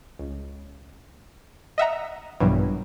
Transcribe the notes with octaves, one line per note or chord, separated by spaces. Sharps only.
C#2
D#5 E5 F#5 A#5
A#1 G2 B2 E3 F#3